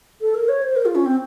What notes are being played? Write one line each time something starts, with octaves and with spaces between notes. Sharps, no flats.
A4
A#4
C#5
C5
A#4
F4
C#4
C4